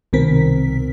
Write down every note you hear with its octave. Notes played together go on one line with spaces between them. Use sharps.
C2 B2 D#3 C4 A#4 B6